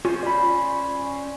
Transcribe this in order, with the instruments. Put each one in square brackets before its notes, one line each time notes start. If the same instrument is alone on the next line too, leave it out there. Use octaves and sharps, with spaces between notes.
[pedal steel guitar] C#4 C5 [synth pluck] F4
[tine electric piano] D5 B5